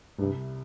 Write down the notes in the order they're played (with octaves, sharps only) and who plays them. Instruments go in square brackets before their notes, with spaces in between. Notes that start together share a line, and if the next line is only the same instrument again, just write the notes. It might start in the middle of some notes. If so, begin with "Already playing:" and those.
[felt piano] C2 C3 G3 [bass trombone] G2